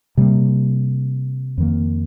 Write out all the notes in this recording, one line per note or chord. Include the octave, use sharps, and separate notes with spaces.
C3 G3 A#3
F2 D#3 A#3